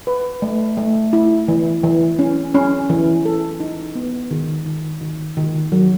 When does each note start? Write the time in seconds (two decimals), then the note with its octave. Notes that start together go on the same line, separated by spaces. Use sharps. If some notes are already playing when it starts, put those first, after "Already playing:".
0.07 B4
0.42 A3
0.77 A3
1.13 E4
1.48 E3
1.84 E3
2.19 C#4
2.54 C#4
2.90 E3
3.25 A4
3.60 D#4
3.95 B3
4.31 D#3
4.66 D#3
5.01 D#3
5.37 D#3
5.72 F#3